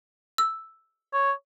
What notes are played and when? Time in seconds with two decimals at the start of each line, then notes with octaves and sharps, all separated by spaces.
0.38 E6
1.13 C#5